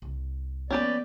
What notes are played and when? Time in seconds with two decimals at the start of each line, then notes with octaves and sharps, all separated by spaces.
0.02 C2
0.71 F3 A#3 B3 C#4 G4 B4 D5